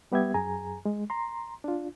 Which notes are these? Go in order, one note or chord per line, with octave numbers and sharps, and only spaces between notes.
G3 B3 G4 E5 G#6
F#2 G#4 G#5 A#5
G#3
A#5 C6
D4 F4